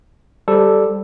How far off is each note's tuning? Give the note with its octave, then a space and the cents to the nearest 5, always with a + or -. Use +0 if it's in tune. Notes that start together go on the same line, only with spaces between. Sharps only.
G3 +0 A4 +0 C5 +15